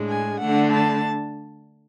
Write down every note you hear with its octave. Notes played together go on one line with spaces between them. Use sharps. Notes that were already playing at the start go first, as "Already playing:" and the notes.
Already playing: A2 G#3 D4
G#5
D3 A3 D4 F#5
A5